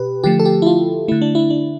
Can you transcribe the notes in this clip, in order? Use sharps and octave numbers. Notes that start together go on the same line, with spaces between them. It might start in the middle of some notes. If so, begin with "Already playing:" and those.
Already playing: B2 G4 B4
D3 F3 A3 G4
A4
G4
E4
F4
D3 A3 E4
D4
E4
D4